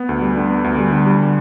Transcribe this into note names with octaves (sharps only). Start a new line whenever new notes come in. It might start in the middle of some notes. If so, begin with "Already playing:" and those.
Already playing: B3
D2
G3
D3
B3
D2
G3
D3
G3